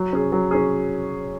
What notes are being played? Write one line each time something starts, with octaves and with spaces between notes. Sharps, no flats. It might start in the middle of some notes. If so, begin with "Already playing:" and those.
Already playing: F#3
C#4 G#4
F#3
C#4 G#4